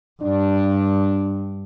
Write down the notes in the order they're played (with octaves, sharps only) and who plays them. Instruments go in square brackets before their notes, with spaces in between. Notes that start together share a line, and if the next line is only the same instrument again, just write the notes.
[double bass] G2 [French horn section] D4